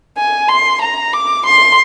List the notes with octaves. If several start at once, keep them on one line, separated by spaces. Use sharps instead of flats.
G#5
C6
A#5
D6
C6